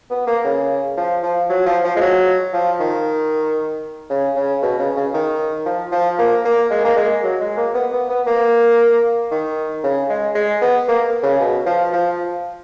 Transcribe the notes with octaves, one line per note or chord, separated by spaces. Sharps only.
B3
A#3
C#3
F3
F3
F#3
F3
F3
G#3
F#3
F3
D#3
C#3
C#3
B2
C#3
C#3
D#3
F3
F3
A#3
A#3
G#3
A#3
G#3
F#3
G#3
A#3
B3
B3
B3
A#3
D#3
C#3
G#3
G#3
B3
A#3
C#3
B2
F3
F3